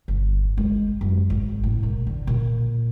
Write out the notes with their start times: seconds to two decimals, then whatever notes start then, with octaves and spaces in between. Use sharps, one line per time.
0.08 G1
0.58 G#3
1.01 F#2
1.30 G#1
1.63 A2
1.83 A#2
2.07 D3
2.27 A#2